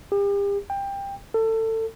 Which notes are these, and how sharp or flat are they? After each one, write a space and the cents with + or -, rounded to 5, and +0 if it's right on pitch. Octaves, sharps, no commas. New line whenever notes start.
G4 +40
G5 +20
A4 +25